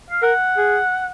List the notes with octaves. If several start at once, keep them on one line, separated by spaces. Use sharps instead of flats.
F5
A#4 F#5
G#4